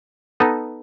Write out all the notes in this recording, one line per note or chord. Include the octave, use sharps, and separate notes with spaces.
B3 D#4 A4 D#5